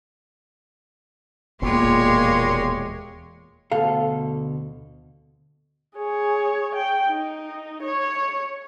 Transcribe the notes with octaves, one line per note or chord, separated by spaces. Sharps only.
E1 D#2 A#2 G#3 B3 G4 C#5 C6
D2 B2 A4 F5
G#4 C#5
G5
D#4
C#5